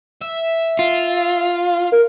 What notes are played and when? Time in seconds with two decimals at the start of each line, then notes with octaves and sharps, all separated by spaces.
0.22 E5
0.79 F4
1.92 A#4